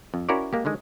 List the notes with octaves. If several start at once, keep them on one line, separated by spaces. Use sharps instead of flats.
F2
C#4 E4 F#4 A#4 C#5 D5
G#3 A#3 G4
D3 D#3 G#3